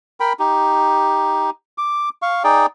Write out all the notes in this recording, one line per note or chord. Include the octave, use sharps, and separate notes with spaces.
A#4 G5 B5
D#4 G4
D6
F5 C#6
D#4 G#4 D5 G5